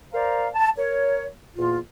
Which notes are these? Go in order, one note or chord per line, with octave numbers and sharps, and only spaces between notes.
A#4 C5 D5 F5 A#5
A5
A#4 C#5
E2 A#2 A#3 F4